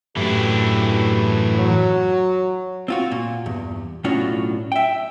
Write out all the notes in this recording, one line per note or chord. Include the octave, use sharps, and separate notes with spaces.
F#2 A2 E3 D4 G4
F#3
C4 F4 F#4
A#2
E2 G2
B1 A2 C#4 D4 F4 F#4
E5 G5